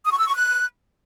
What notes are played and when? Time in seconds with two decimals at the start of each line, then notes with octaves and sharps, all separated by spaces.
0.05 D#6
0.12 C#6
0.19 E6
0.27 C#6
0.34 F#6